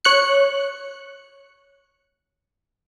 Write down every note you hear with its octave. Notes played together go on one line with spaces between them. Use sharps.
C#5 F#6 C#7